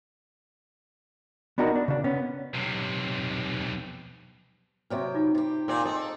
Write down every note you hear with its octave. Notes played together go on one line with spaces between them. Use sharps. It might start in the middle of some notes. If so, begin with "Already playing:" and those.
B3 D4 D#4 F#4 A#4
D4
C#3 D4
B3 C#4
B1 C3
C3 F#3 B4 E5 G5
D#4 F4 D6
C3 G4
A#2 C4
C4 D#4 G#4 A4 D#6